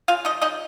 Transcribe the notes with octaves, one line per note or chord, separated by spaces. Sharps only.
C#3 F4 F5
F3 D#4 D#5
C#3 D#4 D#5